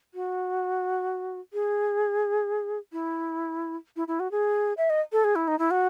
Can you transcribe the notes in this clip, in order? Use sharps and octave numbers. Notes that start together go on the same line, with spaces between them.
F#4
G#4
E4
E4
E4
F#4
G#4
E5
D#5
A4
G#4
E4
D#4
E4
F#4